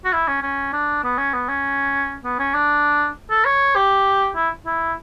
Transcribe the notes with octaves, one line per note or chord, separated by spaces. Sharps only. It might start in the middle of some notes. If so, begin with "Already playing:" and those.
F#4
E4
C#4
C#4
D4
B3
C#4
B3
C#4
B3
C#4
D4
A4
C#5
G4
E4
E4